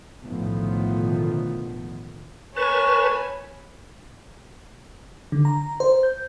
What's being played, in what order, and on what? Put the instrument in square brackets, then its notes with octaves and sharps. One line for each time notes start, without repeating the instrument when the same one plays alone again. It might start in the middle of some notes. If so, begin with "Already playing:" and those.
[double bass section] B1 A2 D3 D#3 F3 B3
[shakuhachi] A#4 [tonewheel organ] B4 A5 [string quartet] C#5 G#5 B5 [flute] C#6
[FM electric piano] D3
A#5
C5
G6